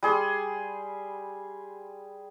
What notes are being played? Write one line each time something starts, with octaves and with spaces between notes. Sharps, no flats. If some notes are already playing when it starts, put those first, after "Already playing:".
G3 G#4 C6